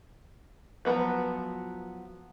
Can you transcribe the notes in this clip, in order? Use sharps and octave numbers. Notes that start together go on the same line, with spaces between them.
F3 F#3 A3 B3 B4